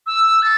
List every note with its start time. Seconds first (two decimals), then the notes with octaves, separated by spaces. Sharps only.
0.07 E6
0.42 A6